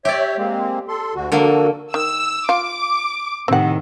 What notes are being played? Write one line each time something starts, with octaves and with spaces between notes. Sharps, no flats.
G4 C#5 D5 E5
G#3 A#3 C4
A4 C6
D2 D3 F#4
D3 F3 A#3 F#4 A4
D#3 E6
F4 D6
A2 C3 D#3 C4 F#5